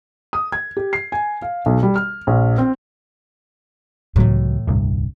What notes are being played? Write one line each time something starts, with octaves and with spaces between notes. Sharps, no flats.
D#6
G#6
G4
C7
G#5
F5
B1
G3
F6
A#1
C4
C#2 A2 E3 F#3
D#1 C2 G2